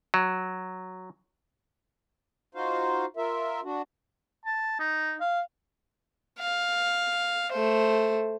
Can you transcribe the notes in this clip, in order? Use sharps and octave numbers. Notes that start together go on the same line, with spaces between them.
F#3
D#4 F4 F#4 C5 F5
F4 A#4 E5
D4 F#4
A5
D#4
F5
F5
A3 C5